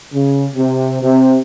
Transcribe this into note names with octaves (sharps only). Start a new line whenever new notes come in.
C#3
C3
C3